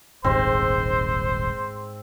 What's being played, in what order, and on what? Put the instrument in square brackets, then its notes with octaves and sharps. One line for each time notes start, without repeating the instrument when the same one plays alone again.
[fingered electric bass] D#1 G#1 [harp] G#2 [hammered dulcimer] C4 [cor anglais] C5